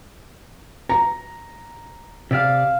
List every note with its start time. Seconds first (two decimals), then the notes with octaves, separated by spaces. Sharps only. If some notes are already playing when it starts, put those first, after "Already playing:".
0.89 A#5
2.31 C3 D5 E5 F5